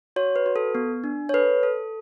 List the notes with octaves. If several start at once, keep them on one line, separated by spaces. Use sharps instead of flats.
F#4 C#5
B4
F#4
A4
B3
D4
C#5
A4 B4
A4